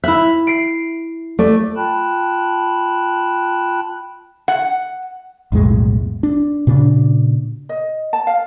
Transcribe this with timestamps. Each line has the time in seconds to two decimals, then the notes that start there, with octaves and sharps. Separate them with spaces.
0.04 E4 E5 F#6
0.47 C7 D7
1.39 A3 D5
1.76 F4 G5 A5 B5 F#6
4.48 F#5
5.52 B1 F2 A2 G#3
6.23 D4
6.67 A#2 C#3 D4
7.69 D#5
8.13 A5
8.27 F5